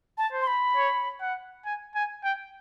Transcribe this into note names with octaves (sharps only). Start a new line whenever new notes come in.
A5
C5
C6
B5
C#5
F#5
G#5
G#5
G5